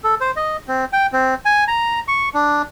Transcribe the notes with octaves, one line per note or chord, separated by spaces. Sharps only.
A4
C5
D#5
C4
G5
C4
G#5
A#5
C#6
D4